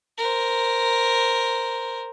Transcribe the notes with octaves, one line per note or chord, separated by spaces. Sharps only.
A#4 C5